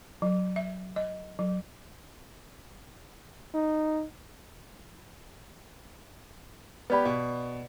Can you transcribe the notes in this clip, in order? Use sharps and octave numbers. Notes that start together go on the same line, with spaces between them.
F#3
E5
D#5
F#3
D#4
B3 G4 B4 D5 B5
B2 F5